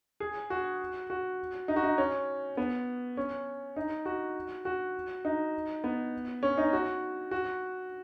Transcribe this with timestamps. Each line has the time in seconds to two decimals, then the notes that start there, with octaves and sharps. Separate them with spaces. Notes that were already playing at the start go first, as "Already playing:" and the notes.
0.20 G#4
0.50 F#4
1.10 F#4
1.68 D#4
1.76 F#4
1.84 D#4
1.98 C#4
2.57 B3
3.17 C#4
3.76 D#4
4.06 F#4
4.65 F#4
5.25 D#4
5.84 B3
6.43 C#4
6.58 D#4
6.73 F#4
7.31 F#4